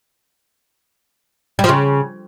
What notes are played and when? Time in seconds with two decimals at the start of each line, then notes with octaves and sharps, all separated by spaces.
1.59 G3
1.64 F3
1.69 C#3